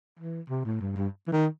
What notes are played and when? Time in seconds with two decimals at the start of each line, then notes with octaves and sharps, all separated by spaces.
0.19 E3
0.50 C3
0.65 A2
0.81 G2
0.96 G2
1.27 E3
1.32 D#3